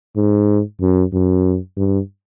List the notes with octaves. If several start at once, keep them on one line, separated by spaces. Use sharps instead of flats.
G#2
F#2
F#2
G2